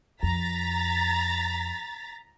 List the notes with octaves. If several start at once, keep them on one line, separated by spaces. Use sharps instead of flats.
F2 A#5 A6 B6